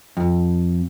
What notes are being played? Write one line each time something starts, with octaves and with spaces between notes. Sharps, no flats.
F2